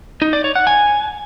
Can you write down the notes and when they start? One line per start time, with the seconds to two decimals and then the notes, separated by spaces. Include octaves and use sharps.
0.22 D#4
0.33 D5
0.44 C#5
0.55 F#5
0.67 G#5